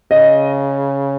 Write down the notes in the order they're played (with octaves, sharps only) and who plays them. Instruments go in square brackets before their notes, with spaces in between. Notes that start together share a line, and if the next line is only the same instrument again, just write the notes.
[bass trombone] C#3 [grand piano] D#5